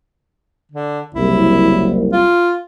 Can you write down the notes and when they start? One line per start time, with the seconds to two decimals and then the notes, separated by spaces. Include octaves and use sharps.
0.71 D3
1.14 F#1 C2 E4
2.13 F4